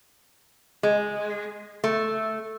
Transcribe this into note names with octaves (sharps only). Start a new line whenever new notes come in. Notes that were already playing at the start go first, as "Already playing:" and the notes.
G#3
A3